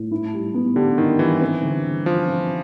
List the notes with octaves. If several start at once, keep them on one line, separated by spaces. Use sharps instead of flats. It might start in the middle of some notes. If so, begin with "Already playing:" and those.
Already playing: A2
E4
G3
B3
D3 G4
D#3 E4
E3 G3
C4
D3
G3
F3 F4
C4